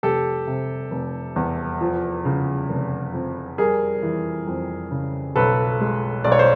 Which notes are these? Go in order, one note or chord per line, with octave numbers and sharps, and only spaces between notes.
F1 G4 A4
C3
F1
E2
F3
C#3
F1
F2
G3 G#4 A#4
E3
F2
C#3
B1 A4 B4
G#3
B1 D5
C#5
C5